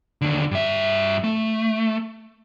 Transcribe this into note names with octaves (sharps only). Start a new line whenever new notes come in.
D#2 D3
G2 E5
A3